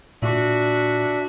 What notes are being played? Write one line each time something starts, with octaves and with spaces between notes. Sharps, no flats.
A#2 D4 F#4 E5